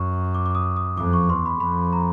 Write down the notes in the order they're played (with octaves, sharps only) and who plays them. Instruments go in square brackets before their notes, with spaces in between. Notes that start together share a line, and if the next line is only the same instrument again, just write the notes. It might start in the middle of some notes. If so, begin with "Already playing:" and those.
Already playing: [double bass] F#2 [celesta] C#6
[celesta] D6
D6
D#6
D#6
[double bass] F2 [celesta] D6
[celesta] C#6
[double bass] E2 [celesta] C6
[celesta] B5
[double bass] F2 [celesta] B5
[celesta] A#5